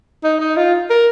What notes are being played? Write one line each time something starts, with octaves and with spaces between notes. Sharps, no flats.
D#4
D#4
F4
A#4